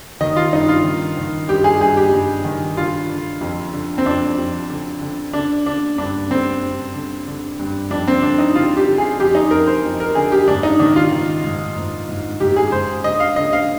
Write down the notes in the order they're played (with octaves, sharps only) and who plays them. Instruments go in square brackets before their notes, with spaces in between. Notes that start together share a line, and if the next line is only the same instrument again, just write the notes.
[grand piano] D#3 D#5
F4
G2 D#4
F4
D#3
D#3
G2 G4
G#4
G2 G#4
G4
G2
D#3
D3 F4
D3
F2
D3
C4
F2 D4
F2
D3
D3
D3 D4
D3 D4
G2 D4
D3 C4
G2
D3
D3
G2
F2 D4
C4
D3 D4
D#4
D3 F4
G4
D3
G#4
F2 G4
D#4
F2 A#4
C5
F2
A#4
D3 G#4
G4
G#2 D4
D#4
D#3 D4
F4
D#3
G#2
G#2
G#2
G#2 G4
G#4
G#2 C5
D3 D#5
F5
D3 D#5
F5